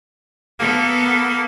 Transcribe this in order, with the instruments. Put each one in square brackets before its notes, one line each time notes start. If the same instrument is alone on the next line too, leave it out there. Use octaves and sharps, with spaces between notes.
[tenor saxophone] A#3 [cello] B3 A4